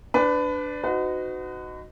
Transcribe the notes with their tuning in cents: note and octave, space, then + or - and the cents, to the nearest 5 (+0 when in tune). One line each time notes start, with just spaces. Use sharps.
D4 +0 B4 +25
D#4 -5 F#4 +0 B4 +45